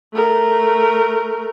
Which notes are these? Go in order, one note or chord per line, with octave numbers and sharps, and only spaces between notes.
A3 A#4